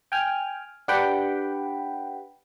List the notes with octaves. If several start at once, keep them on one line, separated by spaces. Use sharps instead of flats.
G5 G#5 F6
D4 G4 B4 F#5 G5 B5